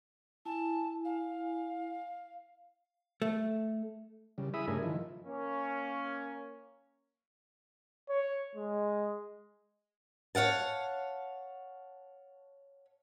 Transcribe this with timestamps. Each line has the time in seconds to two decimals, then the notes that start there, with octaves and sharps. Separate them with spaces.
0.46 E4 G#5 A5
1.05 F5
3.22 A3
4.38 C#3 G3
4.54 E4 G#4 E5 B5 D#6
4.68 G2 C#3 A3 D4 A#4 G#5
4.83 D#3 F3 E4
5.26 A#3 C#4
8.09 C#5
8.55 G#3
10.35 C#5 F5 F#5 A5